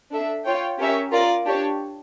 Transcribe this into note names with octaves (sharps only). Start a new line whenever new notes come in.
D4 A4 E5
F4 C#5 G5
C#4 G4 A#4 C#5 E5
F4 A#4 D5
D4 G4 C#5